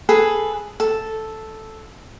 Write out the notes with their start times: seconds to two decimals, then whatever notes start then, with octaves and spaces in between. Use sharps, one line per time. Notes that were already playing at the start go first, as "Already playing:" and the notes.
0.09 G#4 A4 B4
0.80 A4